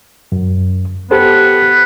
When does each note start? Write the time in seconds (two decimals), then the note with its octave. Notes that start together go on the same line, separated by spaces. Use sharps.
0.32 F#2
1.11 B3 G4 A4 C5